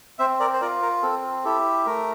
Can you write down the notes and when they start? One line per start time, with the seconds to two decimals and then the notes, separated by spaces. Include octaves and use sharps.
0.19 C4 C5 E5
0.40 A#4 D5
0.53 C5
0.61 F4 A#4 D5
0.82 A#4
1.03 C4 A4
1.45 E4 G4 A4
1.86 A3 A#4